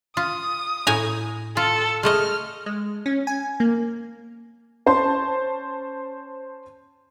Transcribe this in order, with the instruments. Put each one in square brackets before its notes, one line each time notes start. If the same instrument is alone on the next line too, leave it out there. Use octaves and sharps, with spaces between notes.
[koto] F4 [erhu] D#6
[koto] A2 G#5 A#5
[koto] F4 [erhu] A4
[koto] G#3 A3 D#5 [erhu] F6
[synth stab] G#3
C#4
G#5
A#3
[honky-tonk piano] C#4 C5 A5 C6